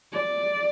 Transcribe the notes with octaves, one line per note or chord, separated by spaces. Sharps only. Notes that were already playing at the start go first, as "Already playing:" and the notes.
D5